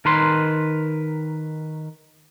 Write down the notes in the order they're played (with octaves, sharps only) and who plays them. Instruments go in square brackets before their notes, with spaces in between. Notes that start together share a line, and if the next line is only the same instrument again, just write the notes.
[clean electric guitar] D#3 A#4 B4 C6